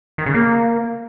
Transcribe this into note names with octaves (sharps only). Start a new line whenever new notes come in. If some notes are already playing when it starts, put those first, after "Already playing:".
D#3
C#3
A#3